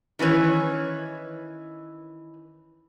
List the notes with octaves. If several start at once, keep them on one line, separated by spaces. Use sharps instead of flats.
D#3 E3 C#4 B4 C#5